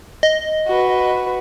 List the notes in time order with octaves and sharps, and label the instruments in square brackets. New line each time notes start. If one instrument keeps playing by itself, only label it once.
[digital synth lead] D#5
[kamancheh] F#4 B4